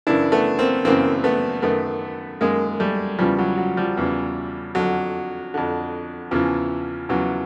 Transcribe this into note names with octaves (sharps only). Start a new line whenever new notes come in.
F#2 C#3 E3 D4 E4
A3 B3
A#3 C4
F#2 C#3 E3 A#3 C4
A3 B3
F#2 D#3 A3 B3
F#2 D#3 G#3 A#3
G3 A3
E2 C#3 E3 F3 G3
F#3
F#3
F3 G3
E2 C#3 E3
F2 D3 F#3
F2 D3
E2 C#3 E3 F3
E2 C#3 E3 F#3